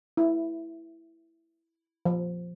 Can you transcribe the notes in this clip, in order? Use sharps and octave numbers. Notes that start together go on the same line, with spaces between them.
E4
F3